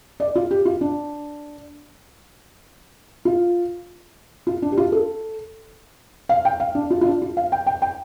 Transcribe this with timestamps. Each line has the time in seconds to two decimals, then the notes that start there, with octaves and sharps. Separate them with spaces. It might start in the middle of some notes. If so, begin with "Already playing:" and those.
0.20 D5
0.35 F4
0.51 G4
0.65 F4
0.81 D4
3.25 F4
4.47 F4
4.62 D4
4.72 G4
4.77 F4
4.92 A4
6.29 F5
6.45 G5
6.60 F5
6.75 D4
6.90 F4
7.01 F4
7.05 D4
7.22 F4
7.37 F5
7.52 G5
7.66 G5
7.82 G5